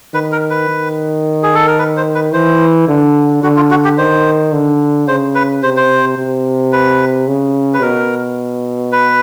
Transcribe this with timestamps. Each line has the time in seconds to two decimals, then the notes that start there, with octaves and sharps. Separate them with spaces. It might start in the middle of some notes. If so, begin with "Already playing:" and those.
0.14 D#3 B4
0.32 A#4
0.50 B4
0.69 D#3
1.43 G#4
1.55 A4
1.67 A#4
1.79 B4
1.97 C5
2.15 B4
2.33 E3 C5
2.88 D3
3.43 D3 F#4
3.56 F4
3.71 F#4
3.84 G4
3.98 D#3 C5
4.53 D3
5.08 C#3 C5
5.35 B4
5.63 C3 C5
5.77 C5
6.18 C3
6.72 B4
7.28 C#3
7.74 B4
7.82 B2 A#4
8.92 B4